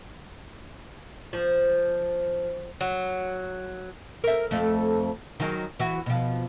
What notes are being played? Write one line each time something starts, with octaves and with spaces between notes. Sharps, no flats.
F3
F#3
A#4 E5
F2 A3
D#3 F#3 G#4
E3 F#4
B2 F3